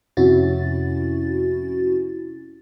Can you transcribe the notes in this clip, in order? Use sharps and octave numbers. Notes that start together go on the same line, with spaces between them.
F2 C3 C#4 E4 F#4 A6